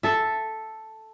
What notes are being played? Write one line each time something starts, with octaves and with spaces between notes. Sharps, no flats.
A4 E5